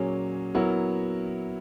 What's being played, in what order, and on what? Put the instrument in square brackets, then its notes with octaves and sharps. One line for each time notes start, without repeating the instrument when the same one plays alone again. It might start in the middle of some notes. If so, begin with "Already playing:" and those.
Already playing: [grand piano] A#2 F#3 A#3 C#4 G#4
F#3 B3 E4 A#4